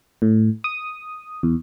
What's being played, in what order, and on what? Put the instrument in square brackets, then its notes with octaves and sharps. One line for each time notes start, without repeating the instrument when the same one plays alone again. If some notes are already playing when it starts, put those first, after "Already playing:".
[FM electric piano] A2
D#6
E2